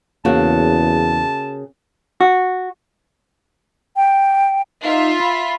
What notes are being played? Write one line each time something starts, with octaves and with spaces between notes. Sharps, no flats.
E2 C#3 A#3 F#4 A5
F#4
G5
D#4 F4 E5
B5